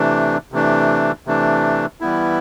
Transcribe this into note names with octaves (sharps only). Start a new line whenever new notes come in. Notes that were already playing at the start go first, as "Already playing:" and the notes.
Already playing: C3 E3 A3 D4
C3 E3 A3 D4
C3 E3 A3 D4
E3 G3 B3 E4